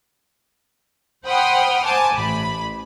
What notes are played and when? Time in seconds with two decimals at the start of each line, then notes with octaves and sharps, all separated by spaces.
1.25 C5 F#5 G5 B5 D#6 F6
1.85 C5 G#5 A5 D6
2.15 A1 B5